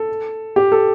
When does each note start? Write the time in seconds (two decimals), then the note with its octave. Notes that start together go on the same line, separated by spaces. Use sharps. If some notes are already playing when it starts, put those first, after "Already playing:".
Already playing: A4
0.56 G4
0.72 A4